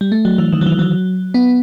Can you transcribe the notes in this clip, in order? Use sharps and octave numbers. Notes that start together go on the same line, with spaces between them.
G3
A3
F#3
E3
D#3
F#3
E3
F#3
B3